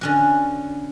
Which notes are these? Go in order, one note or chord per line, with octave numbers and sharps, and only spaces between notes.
D3 C#4 F#4